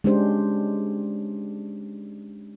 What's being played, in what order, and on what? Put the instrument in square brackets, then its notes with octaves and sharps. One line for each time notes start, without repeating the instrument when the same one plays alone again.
[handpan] G#3 C#4 D4 G4 C5